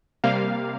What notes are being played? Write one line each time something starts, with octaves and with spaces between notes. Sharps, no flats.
C3 G3 A#3 F5